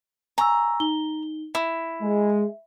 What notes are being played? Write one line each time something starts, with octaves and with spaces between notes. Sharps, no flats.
G#5 A#5 C#6 E6
D#4 G7
E4 E5
G#3